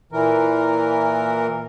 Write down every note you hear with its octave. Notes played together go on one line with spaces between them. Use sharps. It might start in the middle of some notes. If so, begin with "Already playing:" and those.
A#2 E3 A#4